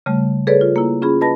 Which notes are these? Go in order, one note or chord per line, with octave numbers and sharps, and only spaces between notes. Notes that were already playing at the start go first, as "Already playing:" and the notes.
C#3 G3 A3
G#4 A4 B4 C#5 D5
F4
A#3 E4
C#4 F4 G#4 B5
B4 D#5 A5 B5 A#6